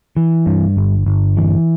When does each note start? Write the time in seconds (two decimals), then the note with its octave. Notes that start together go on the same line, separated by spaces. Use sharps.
0.17 E3
0.46 G2
0.77 G1
1.06 G1
1.37 E3